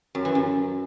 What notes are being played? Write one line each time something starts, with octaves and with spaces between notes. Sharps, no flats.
F#2
E3
F#2